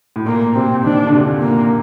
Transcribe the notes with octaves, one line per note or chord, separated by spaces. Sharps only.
A2
A#2 A#3
C3 C4
D#3 D4
D3
C3
A#2
A#3